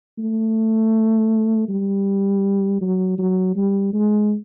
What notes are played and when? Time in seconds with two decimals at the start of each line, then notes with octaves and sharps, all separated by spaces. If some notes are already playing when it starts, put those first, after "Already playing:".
0.18 A3
1.68 G3
2.81 F#3
3.18 F#3
3.56 G3
3.93 G#3